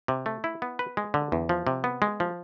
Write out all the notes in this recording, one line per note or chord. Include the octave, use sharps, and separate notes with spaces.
C3
A3
E4
B3
B4
G#3
D3
E2
F3
C3
B3
G#3
F3